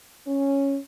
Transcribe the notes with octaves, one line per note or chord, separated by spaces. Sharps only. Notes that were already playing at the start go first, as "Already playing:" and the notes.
C#4